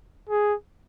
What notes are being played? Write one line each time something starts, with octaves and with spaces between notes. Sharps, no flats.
G#4